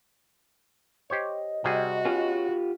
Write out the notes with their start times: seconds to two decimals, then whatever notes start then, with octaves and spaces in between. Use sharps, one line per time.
1.10 G4 C5 C#5 D#5
1.64 C3 G3 F#4 G#4
2.05 C#4 F4 G4 B4